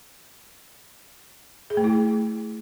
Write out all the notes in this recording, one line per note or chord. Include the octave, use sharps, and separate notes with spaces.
G#4
A3
E4